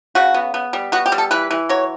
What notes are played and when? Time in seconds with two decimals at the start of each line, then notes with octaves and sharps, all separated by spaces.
0.15 C#3 F#4
0.34 B3
0.54 B3
0.73 G3
0.92 B3 F#4
1.06 G4
1.12 G3
1.18 A4
1.31 E3 B4
1.51 E3
1.69 F#3 C#5